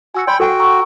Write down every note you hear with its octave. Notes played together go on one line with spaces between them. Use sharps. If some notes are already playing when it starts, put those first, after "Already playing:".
F#4 G#5 E6 C#7
D5 G5 B5 C6
F#4 A4 F#5 G5
A#5 C#6 E6